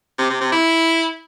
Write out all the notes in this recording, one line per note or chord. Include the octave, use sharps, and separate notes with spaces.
C3
C3
C3
E4